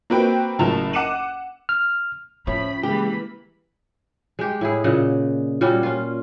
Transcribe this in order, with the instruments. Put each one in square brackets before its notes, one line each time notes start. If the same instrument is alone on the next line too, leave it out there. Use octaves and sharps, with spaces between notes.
[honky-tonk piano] A#3 C4 F#4 B4 G5
F#1 A2 F#3 A5 F7
F#5 D6 C#7 D#7 E7 F#7
[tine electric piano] F6
[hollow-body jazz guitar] A2 [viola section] F3 B5 [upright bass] C#4
[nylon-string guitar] C#3 G#3 [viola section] E3 A#3 B5 [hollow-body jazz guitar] G4
[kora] G#3 G4
A2 E4 G#4
A#2 C#3 D#5 F#5
A#2 G3 C#4 F#4
C#4 F4